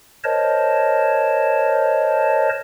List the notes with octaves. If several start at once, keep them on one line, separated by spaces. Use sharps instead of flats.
A#4 C5 C#5 D#5 A5